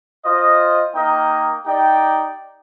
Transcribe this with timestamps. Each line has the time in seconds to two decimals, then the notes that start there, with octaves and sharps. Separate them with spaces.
0.24 F4 C5 D#5
0.95 A#3 D#4 A#4 D#5 G5
1.65 D#4 G4 D5 G5